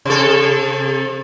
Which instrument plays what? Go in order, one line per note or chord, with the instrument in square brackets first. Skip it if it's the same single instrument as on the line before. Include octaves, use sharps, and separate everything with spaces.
[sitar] C3 A4